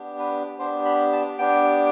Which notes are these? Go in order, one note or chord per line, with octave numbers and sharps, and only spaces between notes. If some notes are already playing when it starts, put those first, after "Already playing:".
Already playing: B3 D4 G4
B4
B3 D4 G4 C5
B5
A5
B3 D4 G4 G5